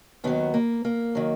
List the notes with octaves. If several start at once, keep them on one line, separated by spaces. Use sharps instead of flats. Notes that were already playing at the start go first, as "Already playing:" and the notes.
D#2 D#3 F#3 B3
A#3
A#3
D#3 F#3